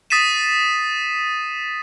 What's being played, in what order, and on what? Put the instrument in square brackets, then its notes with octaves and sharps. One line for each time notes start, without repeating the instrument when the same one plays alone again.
[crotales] D#6 A6 B6 C7 D#7 E7